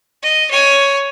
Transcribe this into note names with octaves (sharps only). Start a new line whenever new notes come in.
D#5
C#5 G#5